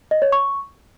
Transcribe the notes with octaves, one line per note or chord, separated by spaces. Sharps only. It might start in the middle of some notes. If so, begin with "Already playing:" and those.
D#5
C#5
C#6